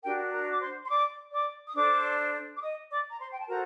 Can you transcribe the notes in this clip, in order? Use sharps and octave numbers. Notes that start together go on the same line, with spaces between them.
D4 F#4 G4 A#4 G5
A#4 A#5
D6
C5 C6
C6
D5 D6
D5 D6
D#6
D4 A4 C5 D5 D6
D6
D#5 D#6
D5 D6
A#5
C5 C6
G5
A5
F#4 A4 A#4 C5 A#5